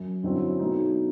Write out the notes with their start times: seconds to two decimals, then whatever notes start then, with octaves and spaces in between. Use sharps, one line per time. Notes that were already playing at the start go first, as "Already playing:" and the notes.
Already playing: F#2
0.23 G1 F#2 F#3 C4 E4
0.59 B2 F#3 A3 D#4